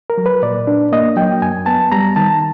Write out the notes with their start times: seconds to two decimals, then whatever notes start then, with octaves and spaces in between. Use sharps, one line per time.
0.10 A#4
0.18 F#3
0.26 B4
0.43 A#2 D5
0.67 D4
0.92 A#3 D#5
1.17 F#3 G5
1.42 F#2 G#5
1.66 B3 A5
1.92 G3 A#5
2.16 D#3 A5